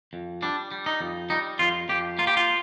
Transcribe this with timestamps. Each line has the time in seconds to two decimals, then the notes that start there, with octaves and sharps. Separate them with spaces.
0.13 F2
0.42 G3 D4
0.71 G3
0.86 D#4
1.01 F2
1.30 G3 D#4
1.59 F2 F4
1.89 F2 G4
2.18 A#3 F4
2.27 G4
2.37 F4